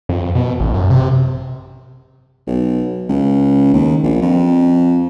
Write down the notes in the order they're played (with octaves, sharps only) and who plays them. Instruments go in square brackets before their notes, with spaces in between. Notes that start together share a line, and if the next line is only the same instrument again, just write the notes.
[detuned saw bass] F2
B2
A1
F#2
C3
[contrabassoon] B1
C#2
D#2
A#1
F2